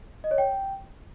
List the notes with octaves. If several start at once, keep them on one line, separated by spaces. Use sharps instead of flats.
D#5
C#5
G5